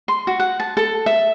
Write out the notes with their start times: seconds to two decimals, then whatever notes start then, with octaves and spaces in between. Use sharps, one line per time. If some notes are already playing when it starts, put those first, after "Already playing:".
0.08 C6
0.27 F#4
0.40 F#5
0.60 A5
0.77 A4
1.06 E5